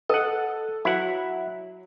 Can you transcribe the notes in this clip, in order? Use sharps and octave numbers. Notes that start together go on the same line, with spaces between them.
A4 D#5 F#5
F#3 E4 F#5